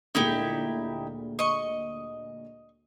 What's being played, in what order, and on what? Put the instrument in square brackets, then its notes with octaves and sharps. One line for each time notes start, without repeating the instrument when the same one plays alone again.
[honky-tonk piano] D2 A#2 G#3 [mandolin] D#4 E4 G4
[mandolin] D#5 C#6